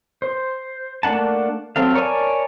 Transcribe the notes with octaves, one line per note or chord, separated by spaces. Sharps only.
C5
A3 A#3 D4 F#5 A5
F#3 C4 A4 F5
A#4 C#5 D5 G#5 A5